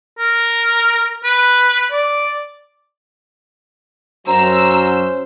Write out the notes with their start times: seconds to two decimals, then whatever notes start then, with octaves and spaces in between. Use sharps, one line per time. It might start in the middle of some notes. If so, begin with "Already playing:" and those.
0.19 A#4
1.24 B4
1.91 D5
4.27 F#2 F#3 C#4 C5 A#5 E6